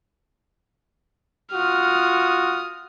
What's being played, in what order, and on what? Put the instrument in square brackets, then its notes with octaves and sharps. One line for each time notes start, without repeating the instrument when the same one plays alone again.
[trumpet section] F4 F#4 [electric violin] D#6 F6